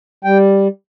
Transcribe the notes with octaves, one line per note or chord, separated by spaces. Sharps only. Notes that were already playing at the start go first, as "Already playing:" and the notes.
G3 G5